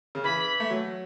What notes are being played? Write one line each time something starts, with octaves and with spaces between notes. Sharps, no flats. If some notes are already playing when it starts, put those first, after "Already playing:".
C#3
E3 B5
A3
F#3